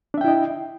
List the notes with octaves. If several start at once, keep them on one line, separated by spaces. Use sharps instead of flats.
D4 E4 D#5 E5 G5